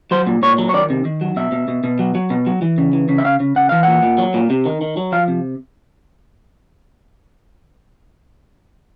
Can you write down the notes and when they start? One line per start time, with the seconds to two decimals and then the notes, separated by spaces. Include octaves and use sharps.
0.11 F#3 C5
0.27 A#2
0.42 A#2 C#5
0.58 F#3
0.69 C#5
0.74 D#3 D5
0.90 C3
1.05 D#3
1.21 F#3
1.36 B2 E5
1.52 B2
1.68 B2
1.84 B2
1.99 F#3
2.15 F#3
2.30 B2
2.46 F#3
2.62 E3
2.78 C#3
2.93 E3
3.09 C#3
3.18 E5
3.25 C#3 F5
3.40 C#3
3.56 C#3 F#5
3.69 E3 F5
3.83 A#2 F#5
4.03 A#2
4.18 F#3
4.34 A#2
4.50 C3
4.66 D#3
4.81 D#3
4.97 F#3
5.12 F3 F5
5.28 C3